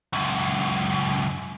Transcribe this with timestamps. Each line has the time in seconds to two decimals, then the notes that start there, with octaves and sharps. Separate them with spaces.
0.13 C#2 F#2